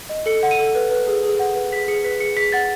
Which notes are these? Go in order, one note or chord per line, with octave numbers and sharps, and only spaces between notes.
D#5
A4 C#7
F#5
D#7
A4
B4
B4
G#4
G#4
F#5
B4
G#4 B6
G#4 C#7
B4 B6
G#4 C#7
G#4 B6
F#5 A6